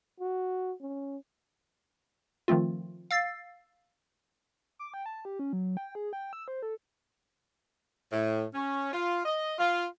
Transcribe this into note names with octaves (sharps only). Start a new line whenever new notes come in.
F#4
C#4
D#3 F3 A3 C4 F4
F5 E6 A6 C7
D6
G5
A5
G4
C#4
F#3
G5
G#4
G5
E6
C5
A4
A2
C#4
F4
D#5
F4